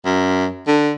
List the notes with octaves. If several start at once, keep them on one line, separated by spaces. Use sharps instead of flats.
F#2
D3